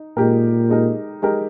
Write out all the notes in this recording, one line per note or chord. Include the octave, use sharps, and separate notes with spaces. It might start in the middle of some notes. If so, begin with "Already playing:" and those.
Already playing: D#4
A#2 G#3 D#4 G4 A#4
G#3 D#4 G4 A#4
G#3 D#4 G4 A#4